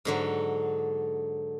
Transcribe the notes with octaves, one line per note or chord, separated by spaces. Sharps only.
G#2 D3 F#3